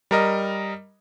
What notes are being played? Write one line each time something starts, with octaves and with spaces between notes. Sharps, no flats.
G3 A#4 D#5